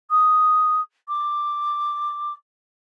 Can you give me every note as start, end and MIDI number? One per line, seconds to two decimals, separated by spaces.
0.10 0.81 87
1.08 2.33 86